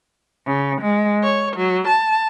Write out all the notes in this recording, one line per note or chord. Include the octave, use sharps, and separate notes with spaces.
C#3
G#3
C#5
F#3
A5